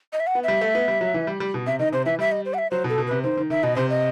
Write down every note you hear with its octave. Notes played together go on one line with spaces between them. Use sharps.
D#5
E5
F#5
B3
G3 E5
A3
B3
G3
F#3
E3
G3
G3
B2
C3 E5
D#3 D#5
C3 C5
E3 E5
G3 E5
D#5
C5
F#5
E5
F#3 C5
B2
A4
B2
C3 B4
D#3 C5
D#3
D#3 E5
B2 D#5
C3 C5
D#5